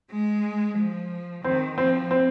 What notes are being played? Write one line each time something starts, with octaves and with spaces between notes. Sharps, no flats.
G#3
F3
D#3 C4
F3 C4
C4